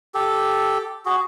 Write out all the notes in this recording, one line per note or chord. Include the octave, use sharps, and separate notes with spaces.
G4 A4
F#4 G#4